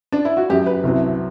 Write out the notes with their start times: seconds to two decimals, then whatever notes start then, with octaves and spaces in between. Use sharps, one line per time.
0.12 D4
0.25 E4
0.37 F#4
0.50 F#2 F#3 G4
0.66 B4
0.83 C2 C3 F#3